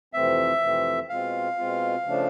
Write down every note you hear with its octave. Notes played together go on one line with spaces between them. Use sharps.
F2 C3 E3 A3 C4 E5
F2 C3 E3 A3 C4
B2 G#3 C4 F4 F5
B2 G#3 C4 F4
C#3 F3 A3 D4